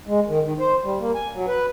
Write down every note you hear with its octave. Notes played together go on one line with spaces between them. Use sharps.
G#3
D#3
D#3
C5
G3
A#3
G#5
F#3
B4